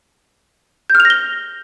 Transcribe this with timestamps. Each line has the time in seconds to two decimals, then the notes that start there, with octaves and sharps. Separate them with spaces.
0.90 G6
0.95 F6
1.00 F7
1.05 A#6
1.10 G7